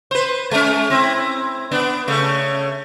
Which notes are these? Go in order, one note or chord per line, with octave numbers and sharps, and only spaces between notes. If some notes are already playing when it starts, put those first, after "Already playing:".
B4 C5
G#3 C#4
C4 E4
B3 D4
C#3 A3